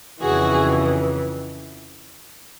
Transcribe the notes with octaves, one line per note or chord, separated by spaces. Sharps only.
F2 C#3 E3 F#4 G#4